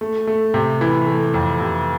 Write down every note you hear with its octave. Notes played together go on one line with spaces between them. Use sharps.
A3
A3
C3
E3
A3
F2
C3